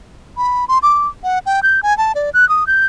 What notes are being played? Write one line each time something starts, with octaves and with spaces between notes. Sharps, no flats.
B5
C6
D6
F#5
G5
G6
G#5
A5
D5
F#6
D#6
G6